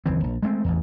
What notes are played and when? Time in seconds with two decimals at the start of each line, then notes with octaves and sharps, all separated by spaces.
0.06 F#1 D#2 E3 C4
0.24 A#1
0.43 G#3 A3 B3 C4
0.64 A1 E2